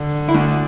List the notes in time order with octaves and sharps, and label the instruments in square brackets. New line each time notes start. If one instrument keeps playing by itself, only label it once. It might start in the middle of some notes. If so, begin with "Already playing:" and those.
Already playing: [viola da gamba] D3
[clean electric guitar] E4
A3 D4